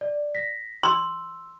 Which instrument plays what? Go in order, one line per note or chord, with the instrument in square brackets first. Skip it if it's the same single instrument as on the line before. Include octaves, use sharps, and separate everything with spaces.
[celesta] D5
A#6 B6
[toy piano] C6 [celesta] E6